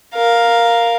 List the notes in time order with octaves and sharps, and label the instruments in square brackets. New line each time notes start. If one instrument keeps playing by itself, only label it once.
[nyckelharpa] A#4 F5